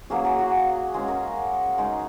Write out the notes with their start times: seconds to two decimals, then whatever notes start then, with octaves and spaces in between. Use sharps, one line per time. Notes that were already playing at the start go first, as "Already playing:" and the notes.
0.10 F#3 A#3 C#4 G#4
0.25 G#4
0.39 F#4
0.94 G#3 C#4 G#4
1.08 A#4
1.78 G#3 D#4 G#4